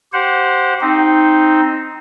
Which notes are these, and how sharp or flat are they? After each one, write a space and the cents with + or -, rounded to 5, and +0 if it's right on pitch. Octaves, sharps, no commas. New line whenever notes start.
G4 -25 C5 +0 F#5 -25
C4 +0 D#4 +0